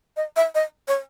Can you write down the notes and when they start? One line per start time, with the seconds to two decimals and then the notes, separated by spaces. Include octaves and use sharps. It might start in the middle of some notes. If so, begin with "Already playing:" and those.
0.17 D#5
0.36 E5
0.55 D#5
0.88 C#5